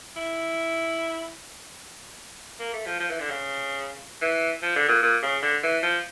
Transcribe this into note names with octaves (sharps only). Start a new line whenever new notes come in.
E4
A#3
A3
F3
F3
E3
D3
C#3
E3
F3
D3
A#2
A#2
C#3
D3
E3
F3